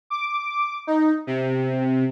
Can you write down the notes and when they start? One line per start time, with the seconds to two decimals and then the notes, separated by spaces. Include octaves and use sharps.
0.10 D6
0.87 D#4
1.27 C3